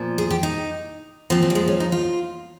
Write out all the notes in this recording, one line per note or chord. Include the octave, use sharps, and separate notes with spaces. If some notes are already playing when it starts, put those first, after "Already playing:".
Already playing: A#2 F3
G#4
G4
D#4
A#2 F3 C4
C4
G3
G#3
C#4
D#4
F4